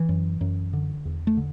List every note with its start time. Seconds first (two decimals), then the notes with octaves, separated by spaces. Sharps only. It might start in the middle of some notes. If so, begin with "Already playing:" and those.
Already playing: E3
0.09 F#2
0.41 F#2
0.73 D3
1.05 E2
1.27 A3
1.37 D3